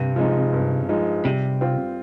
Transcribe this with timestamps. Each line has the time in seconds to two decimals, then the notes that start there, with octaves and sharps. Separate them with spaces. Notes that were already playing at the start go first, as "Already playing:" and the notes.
Already playing: G2 C3
0.16 F3 G#3 D#4
0.53 G2
0.89 F3 G#3 D#4
1.24 C3 G3
1.61 C4 F4